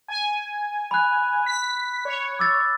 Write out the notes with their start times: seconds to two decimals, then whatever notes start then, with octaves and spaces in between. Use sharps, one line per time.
0.08 G#5
0.91 B5 F#6
1.46 B6
2.05 C#5
2.39 D6 E6 A6